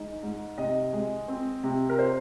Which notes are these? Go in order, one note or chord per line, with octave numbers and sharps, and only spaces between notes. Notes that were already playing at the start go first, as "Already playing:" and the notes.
Already playing: G#3 D#4
G#2
C3 D#5
G#3
C4
C3
A#4
C5